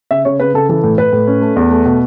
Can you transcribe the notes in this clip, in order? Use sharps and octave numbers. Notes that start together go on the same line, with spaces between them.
C#3 E5
C#3 C#5
C#3 B4
C#3 A4
E3 A4
A2
A2 B4
A2
C#4
A3
E2
A3
B2